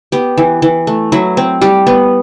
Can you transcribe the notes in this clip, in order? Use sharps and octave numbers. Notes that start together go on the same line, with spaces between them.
B3 G4
E3
E3
A3
F#3 E4
C4
G3 G4
B3